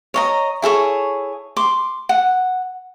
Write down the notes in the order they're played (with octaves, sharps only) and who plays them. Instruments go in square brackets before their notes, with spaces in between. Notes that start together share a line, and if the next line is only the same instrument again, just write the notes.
[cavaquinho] C#5 D#5 A#5
E4 G#4 A4 C#5
C6 D6
F#5